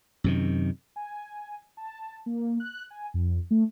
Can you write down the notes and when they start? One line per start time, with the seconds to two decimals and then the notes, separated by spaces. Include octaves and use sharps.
0.24 F#2 C3 D#3
0.96 G#5
1.77 A5
2.26 A#3
2.60 F#6
2.90 G#5
3.14 F2
3.51 A3